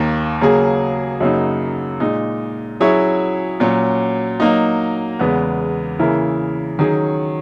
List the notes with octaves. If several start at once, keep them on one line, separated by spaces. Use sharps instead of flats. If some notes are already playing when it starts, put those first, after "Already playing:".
Already playing: D#2 D#3 A#3
C#3 F#3 A#3 C#4 G#4
F#2 C#3 F#3 A#3 D#4
A#2 G#3 D#4
F#3 C#4 E4 G#4 C#5
A#2 F#3 C#4
F#3 A#3 D#4
E2 C#3 G#3 B3
C#3 E3 A#3 E4 A#4
D#3 F#3 C#4 G#4